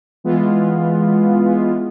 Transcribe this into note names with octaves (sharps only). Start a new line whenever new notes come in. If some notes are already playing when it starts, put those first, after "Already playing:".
E3 G#3 B3 F4